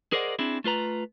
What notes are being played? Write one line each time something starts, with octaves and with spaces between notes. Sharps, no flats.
G#4 A#4 C5 D5 D#5 F#5
C4 D4 E4 G#4
A3 F4 B4 A#5